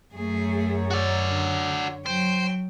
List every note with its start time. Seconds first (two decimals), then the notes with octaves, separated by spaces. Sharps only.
0.14 F#2 A3 G#4 C#5
0.91 F#4 D5
1.27 D3
2.06 F#3 C5 G5